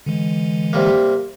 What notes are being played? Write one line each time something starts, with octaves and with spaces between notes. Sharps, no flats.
D3 E3 G#3
C3 G3 A#3